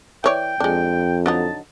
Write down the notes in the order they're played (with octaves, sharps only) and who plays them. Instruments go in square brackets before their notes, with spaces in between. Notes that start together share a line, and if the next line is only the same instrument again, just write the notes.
[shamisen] E3 C#5 D5 [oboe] G5
[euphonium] F2 [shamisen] G#3 D4
[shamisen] D3 F#3 D#4 [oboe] A5